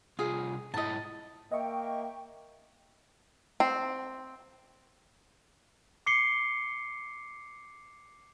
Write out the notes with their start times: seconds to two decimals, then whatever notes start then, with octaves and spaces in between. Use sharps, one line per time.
0.19 C2 F4 G#4
0.74 G#2 E4 D#5 A5
1.52 A#3 D#5 E5 G5 C#6
3.60 C4
6.06 D6 C7 C#7 G7